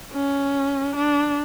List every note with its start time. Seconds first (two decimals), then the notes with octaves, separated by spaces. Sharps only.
0.13 C#4
0.96 D4